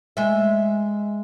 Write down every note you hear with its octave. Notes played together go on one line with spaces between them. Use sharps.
G#3 E5